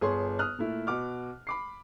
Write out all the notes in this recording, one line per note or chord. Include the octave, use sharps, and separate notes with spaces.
G1 G#4 C#5 C6
D#6 F6 F#6
A#2 A3 E4
B2 F#5 D6 F6
B5 D6 C7